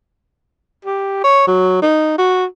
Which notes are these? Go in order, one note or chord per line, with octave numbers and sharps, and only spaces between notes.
G4
C#5
F#3
D#4
F#4